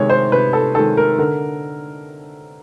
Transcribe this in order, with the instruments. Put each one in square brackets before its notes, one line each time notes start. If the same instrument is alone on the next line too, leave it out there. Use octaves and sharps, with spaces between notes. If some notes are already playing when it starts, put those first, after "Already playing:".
Already playing: [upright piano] C3 D#3 G#3 C#5
C5
C3 B4
A4
D#3 G#3 A4
A#4
D3 A#4